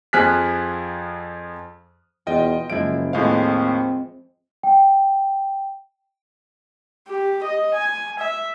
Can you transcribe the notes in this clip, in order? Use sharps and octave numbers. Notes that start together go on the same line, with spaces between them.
F2 F3 G#4 F6 F#6 B6
E2 B2 F4 D#5 G5
F#1 F3 G#3 E4 D7
D#2 A2 F3 G#3 C4 F5
G5
G4
D#5
G#5
E5